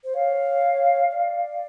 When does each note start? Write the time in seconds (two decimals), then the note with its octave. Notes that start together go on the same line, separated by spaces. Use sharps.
0.04 C5
0.14 C#5 F5
1.11 D5